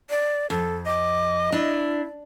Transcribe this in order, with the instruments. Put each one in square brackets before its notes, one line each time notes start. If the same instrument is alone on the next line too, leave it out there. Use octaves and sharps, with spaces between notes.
[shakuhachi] D5
[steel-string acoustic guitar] F2 [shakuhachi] A4
[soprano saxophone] D#5 [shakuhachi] D6
[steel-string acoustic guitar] D4 [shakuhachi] E4